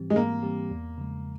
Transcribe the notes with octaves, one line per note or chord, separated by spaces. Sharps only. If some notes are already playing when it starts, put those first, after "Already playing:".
Already playing: G#2 E3 G3 C4 G4
G#3
G#2 A#3
E3 G3 C4 G4
E2
C#3 F3 G#3